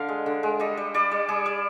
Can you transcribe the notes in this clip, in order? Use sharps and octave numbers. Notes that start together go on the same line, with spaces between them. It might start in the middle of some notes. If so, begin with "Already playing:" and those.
Already playing: D3 F5
G#3
D3
G#3
G3 D#5
G3
G3 D5
G3
G3 G#4
G3